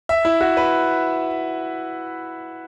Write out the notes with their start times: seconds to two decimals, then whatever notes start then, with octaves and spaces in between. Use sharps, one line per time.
0.09 E5
0.25 E4
0.41 F#4
0.57 B4